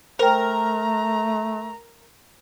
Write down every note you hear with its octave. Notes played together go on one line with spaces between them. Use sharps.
A3 A#4 C5 G5 A#5